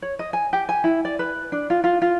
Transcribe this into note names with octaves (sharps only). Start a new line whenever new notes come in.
C#5
D#5
G#5
G4
G#5
E4
D5
B4
D4
F4
F4
F4